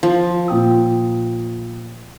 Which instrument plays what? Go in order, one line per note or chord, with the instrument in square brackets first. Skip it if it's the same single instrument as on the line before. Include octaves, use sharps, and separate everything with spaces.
[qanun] F3
[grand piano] A#2 G5 D#6